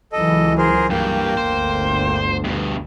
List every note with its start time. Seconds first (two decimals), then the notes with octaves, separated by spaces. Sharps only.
0.12 C#2 E3 F#3 A4 D#5
0.58 G#4 A#4 C5
0.90 G2 A#3 G5
1.37 G1 D2 C5
2.45 G2 B2